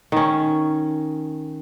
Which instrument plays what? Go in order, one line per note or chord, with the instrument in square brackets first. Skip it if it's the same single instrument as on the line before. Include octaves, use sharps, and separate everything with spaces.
[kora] D#3 C#4